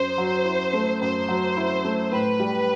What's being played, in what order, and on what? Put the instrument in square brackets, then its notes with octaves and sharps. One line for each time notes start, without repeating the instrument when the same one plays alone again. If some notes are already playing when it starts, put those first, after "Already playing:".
Already playing: [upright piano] F#2 [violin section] C5
[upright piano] F#3
E4
A3
[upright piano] F#2 [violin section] C5
[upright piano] F#3
E4
A3
[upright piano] A2 [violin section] B4
[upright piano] G3